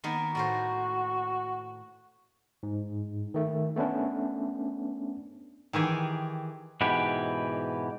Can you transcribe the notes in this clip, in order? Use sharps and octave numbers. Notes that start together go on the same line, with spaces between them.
D#3 A#3 B3
A2 F#4 A#4 C5
G#2
D#3 A3
A3 B3 C#4 D4
D#3 E3 G4 G#4
G#2 B2 E3 G4 B4